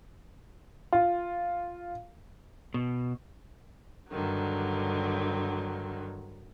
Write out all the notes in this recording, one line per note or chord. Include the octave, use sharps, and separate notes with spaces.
F4
B2
G2 D3 D#3 F#3